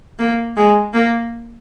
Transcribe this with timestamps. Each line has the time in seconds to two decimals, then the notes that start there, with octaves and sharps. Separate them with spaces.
0.19 A#3
0.57 G#3
0.94 A#3